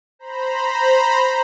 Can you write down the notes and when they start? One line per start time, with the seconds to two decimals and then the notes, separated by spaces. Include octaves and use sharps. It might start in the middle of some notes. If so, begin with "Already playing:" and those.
0.19 C5 A#5 B5